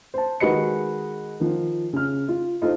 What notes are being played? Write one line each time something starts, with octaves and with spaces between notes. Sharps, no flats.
C5 A5
D#3 G#3 F#4 B4 D#5 C#7
D#3 F3
C#3 F6
F4
D#4 F4 A4 C5